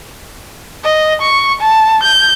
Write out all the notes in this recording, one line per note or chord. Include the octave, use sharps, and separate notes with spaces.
D#5
C#6
A5
G6